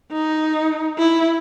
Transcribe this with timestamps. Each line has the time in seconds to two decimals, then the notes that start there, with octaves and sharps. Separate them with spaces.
0.12 D#4
0.98 E4